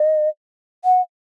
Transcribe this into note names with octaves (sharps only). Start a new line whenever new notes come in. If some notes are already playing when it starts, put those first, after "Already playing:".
Already playing: D#5
F#5